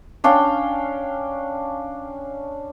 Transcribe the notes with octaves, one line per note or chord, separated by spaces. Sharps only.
C#4 D4 F5 G5